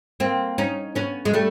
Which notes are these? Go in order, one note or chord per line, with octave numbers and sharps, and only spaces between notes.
A#3 C4
C#4 D#4
B3 C#4
G#3
G3 A3